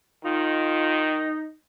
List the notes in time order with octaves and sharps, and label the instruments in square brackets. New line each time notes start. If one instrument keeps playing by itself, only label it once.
[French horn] D#3 [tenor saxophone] D#4 [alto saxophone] F4